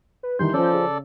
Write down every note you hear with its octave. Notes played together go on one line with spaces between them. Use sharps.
B4
D#3 E3 G3 C6 G6
F3 C#4 A4 D5
C#3